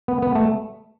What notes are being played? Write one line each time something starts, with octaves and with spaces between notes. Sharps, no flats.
B3
B3
A3